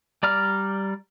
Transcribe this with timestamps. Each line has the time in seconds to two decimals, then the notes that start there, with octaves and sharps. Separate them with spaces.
0.23 G3 D5 A#5 F6